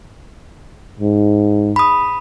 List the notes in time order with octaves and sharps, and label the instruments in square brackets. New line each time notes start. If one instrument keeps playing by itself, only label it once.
[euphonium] G#2
[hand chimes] B5 D#6